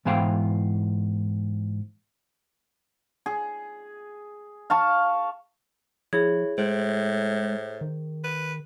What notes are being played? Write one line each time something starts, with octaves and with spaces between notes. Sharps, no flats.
G#2 E3 B3 C5 F5 G5
G#4
F5 A5 C#6
F3 E4 G#4 C#5
A2 G#3 C5
D#3
B4